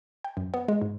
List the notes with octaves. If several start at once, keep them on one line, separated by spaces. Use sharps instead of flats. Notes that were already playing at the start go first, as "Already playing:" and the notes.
G5
F#2
B3
G#3
G#2